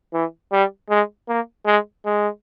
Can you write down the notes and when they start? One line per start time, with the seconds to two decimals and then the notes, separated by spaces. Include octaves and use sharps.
0.13 E3
0.52 G3
0.89 G#3
1.29 A#3
1.66 G#3
2.05 G#3